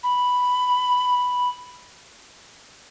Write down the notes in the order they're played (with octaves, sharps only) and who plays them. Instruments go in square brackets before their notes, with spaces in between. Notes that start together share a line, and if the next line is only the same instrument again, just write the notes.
[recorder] B5